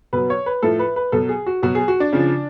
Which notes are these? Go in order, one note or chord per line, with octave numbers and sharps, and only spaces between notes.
B2 F#3 B4
C#5
B4
A2 F3 A4
B4
B4
B2 F#3 A4
G#4
F#4
B2 F#3 F#4
G#4
F#4
D4
C#3 F3